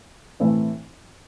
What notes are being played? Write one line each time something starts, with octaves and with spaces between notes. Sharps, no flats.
A2 E3 A3 C4 E4